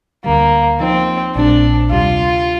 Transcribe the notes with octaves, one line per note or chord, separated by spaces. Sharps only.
D2 D3 G3 A#3
F3 A#3 C4 D#4
A#1 A#2 G3 C4 D4
D2 C3 G3 F4